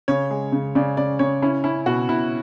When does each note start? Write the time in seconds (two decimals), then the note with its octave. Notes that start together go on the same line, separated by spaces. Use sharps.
0.08 C#3 C#5
0.31 G#3
0.52 C#3
0.75 C#3 D5
0.97 C#3 D5
1.19 C#3 C#5
1.42 C#4 E4
1.64 C#4 E4
1.86 B2 F#4
2.09 B2 E4